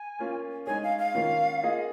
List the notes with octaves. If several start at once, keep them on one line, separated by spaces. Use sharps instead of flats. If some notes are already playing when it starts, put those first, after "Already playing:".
Already playing: G#5
A#3 C#4 F4
G#3 D#4 G#4 C#5 G#5
F5
F5
D#3 A#3 C#4 F4
A#3 F4 G#4 D#5